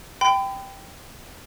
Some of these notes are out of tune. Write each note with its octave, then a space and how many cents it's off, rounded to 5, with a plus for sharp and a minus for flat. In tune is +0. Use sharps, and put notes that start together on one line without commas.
G5 +0 B5 +40